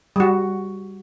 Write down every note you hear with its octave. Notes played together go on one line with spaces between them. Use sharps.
G3 F#4